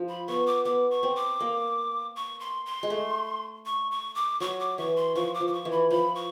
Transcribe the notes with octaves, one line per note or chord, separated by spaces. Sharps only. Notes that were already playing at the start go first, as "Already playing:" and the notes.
Already playing: F3
B5
B3 C#6
D6
B3 D6
C#6
C4
D6
A#3
C#6
C6
C6
G#3
A3
C#6
C#6
D6
F#3 C#6
D6
E3 C#6
C6
F3 C#6
D6
F3
D6
C#6
E3
B5
F3 B5
C#6